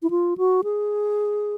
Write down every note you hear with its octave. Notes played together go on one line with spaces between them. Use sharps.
E4
F4
F#4
G#4